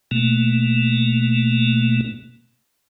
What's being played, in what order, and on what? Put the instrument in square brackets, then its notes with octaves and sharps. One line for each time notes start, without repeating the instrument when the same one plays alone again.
[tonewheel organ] B2 A3 A#3